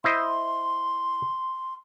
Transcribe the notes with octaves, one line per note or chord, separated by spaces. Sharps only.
E4 C5 D#5 C6